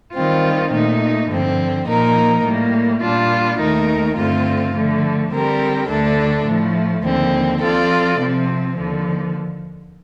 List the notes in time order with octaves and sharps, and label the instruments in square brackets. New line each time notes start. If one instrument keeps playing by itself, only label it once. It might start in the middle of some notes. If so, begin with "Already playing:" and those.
[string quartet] D#3 G3 C4 F4
A#2 A3 D#4
G2 D3 F3 C4
A#2 F3 A#3 D#4 A#4
A2 G3 A#3
A#2 G3 D4 F4
D#2 D#3 A3 D#4 A#4
G2 D3 A3 C4 F4
D3 F3 A3
D3 G3 C4 G4 A#4
D2 D3 A3 D4 A4
A2 F3 A3
D#2 D3 F3 C4
F3 C4 F4 A4 D5
C3 F3 C4
D#2 D3 F3